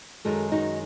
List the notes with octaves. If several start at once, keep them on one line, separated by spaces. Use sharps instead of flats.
F#2 D#3 G#3 F#4 A4
D#4 F#4